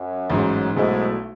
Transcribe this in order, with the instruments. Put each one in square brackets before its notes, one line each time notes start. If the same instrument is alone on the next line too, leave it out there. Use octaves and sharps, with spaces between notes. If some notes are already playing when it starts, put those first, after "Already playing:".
Already playing: [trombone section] F#2
[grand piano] A1 G#2 F#3
[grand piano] B1 B2 A3 E4 [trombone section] G#2